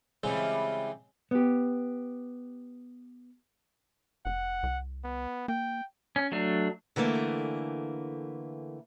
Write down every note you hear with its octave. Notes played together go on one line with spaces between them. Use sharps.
C#3 E3 G3 G#3 C4
B3 G4
F1 F#5
C2
B3
A#3 G5
C#4
F#3 A3 D4
D3 E3 A3 A#3